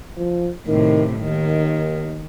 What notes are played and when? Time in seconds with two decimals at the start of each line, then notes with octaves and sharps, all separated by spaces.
0.17 F3
0.68 A2 C3 D#3
1.19 D#2 D#3